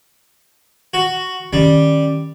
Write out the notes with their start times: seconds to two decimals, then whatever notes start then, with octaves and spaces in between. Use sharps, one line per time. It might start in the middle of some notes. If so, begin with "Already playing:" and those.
0.94 F#4
1.53 D#3 G3 C#4